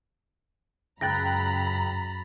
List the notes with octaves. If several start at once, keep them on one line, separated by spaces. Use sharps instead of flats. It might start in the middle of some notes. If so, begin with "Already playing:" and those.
C#2 F#2 G5 A#5 B5 F#6 A6 A#6